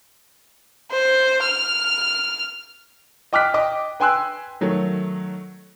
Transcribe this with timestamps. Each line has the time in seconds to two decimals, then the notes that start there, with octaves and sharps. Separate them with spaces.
0.91 C5
1.42 F6
3.33 D#5 G5 D6 F6 F#6 B6
3.54 D#5 G5 D6
4.00 B4 G5 G#5 C6 E6 F#6
4.61 D#3 F#3 A3